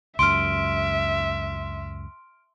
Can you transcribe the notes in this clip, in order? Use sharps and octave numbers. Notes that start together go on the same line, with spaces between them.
C#2 F#2 E5 C6 F6 D7